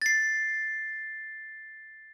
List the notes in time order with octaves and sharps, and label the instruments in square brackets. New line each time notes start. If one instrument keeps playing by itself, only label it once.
[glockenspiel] A6 C7